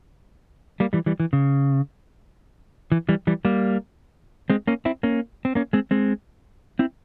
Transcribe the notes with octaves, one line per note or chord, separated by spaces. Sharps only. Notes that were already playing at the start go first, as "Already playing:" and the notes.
G3 A#3
E3 G3
E3 G3
E3
C#3
E3
E3 G3
E3 G3
G3 A#3
G#3 C4
A#3 C#4
C4 E4
A#3 C#4
C4
A#3 C#4
G#3 C4
G#3 C4
C4 E4